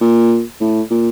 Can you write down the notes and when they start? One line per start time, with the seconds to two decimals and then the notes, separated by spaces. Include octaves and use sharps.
0.01 A#2
0.61 A2
0.90 A#2